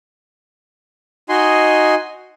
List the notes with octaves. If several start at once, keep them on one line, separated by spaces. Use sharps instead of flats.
D#4 F#4 D#5 G#5 C6